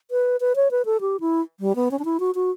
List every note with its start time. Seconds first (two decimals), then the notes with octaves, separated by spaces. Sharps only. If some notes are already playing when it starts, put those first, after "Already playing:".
0.11 B4
0.41 B4
0.56 C#5
0.71 B4
0.85 A4
1.01 G4
1.20 E4
1.60 G3
1.76 B3
1.91 C#4
1.99 D4
2.05 E4
2.20 F#4
2.35 F#4